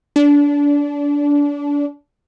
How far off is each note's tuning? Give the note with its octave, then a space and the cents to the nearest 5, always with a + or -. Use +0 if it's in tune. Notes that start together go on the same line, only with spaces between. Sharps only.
D4 -25